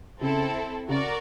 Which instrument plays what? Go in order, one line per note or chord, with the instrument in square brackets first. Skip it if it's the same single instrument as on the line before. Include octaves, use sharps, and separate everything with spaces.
[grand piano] C#3 [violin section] C4 E4 A4
[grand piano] C#3 [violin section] F#4 A#4 D5